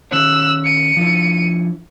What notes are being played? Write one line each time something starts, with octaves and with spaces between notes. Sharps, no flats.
D#3 C#4 C#5 E6 F#6
C#7 D#7
F3 D4 E4